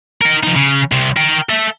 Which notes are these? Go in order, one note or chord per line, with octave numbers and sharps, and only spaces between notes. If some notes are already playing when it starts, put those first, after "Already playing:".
D#4 A#4
F3 D#4
C#3
C2 C3
A#4 G5
A4 E5